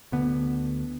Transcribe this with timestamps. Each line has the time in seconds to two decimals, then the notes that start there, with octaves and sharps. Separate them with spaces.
0.12 D2 D3 B3